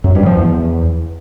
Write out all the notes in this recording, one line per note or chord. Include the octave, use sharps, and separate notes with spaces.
F#2
G2
F3
E2